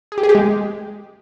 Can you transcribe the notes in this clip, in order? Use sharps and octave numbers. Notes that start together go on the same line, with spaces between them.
G#4
G4
G#4
G4
G#3